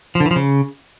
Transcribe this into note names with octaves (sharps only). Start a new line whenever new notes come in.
F3
D3
E3
F3
C#3